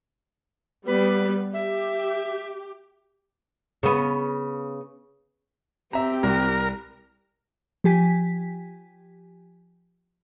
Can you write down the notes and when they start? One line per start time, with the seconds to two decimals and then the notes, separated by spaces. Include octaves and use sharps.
0.86 G3 B3 B4
1.54 G4 E5
3.83 C#3 B3
5.93 C4 G4 E5 A#5
6.23 C2 A#4
7.84 F3 G4 G#5 B6